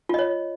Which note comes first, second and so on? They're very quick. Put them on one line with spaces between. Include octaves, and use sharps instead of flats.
F4 D#5 C#5